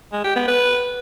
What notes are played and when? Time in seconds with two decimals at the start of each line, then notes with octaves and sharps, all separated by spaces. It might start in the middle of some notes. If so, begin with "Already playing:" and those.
0.13 G#3
0.24 G4
0.36 B3
0.48 B4